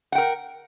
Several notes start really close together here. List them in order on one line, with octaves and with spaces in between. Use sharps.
F#5 G5 A#4